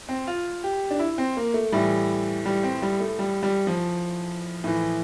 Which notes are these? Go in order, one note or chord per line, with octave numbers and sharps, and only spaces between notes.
C4
F4
G4
D4
E4
C4
A#3
A3
A2 E3 G3
G3
C4
G3
A3
G3
G3
F3
A2 E3